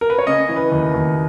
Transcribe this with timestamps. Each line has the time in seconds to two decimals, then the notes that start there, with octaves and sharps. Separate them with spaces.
0.01 A#4
0.10 B4
0.18 C#5
0.27 C#3 D#5
0.49 E3
0.56 B4
0.72 D#2
0.94 D#2